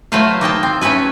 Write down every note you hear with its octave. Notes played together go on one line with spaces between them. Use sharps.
F#3 A3 E4 B4 C5 F5
A#3 D#4 G5 A5
C4
A3 C#4 E4 B4 G#5